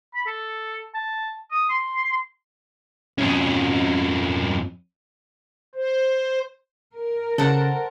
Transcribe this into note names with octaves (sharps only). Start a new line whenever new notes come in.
B5
A4
A5
D#6
C6
F2 C#4
C5
A#4
C#3 A4 C5 F#5